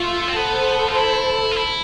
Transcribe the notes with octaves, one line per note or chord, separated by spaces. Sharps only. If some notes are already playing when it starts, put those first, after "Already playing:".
Already playing: A3 F4
C4
B3 A4 C5
F4
E4
F4
E4